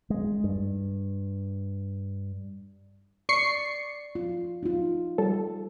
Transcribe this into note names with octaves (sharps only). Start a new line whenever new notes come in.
G#3
G2
D5 C#6 C7 C#7
F4
D#4 F4
G3 A4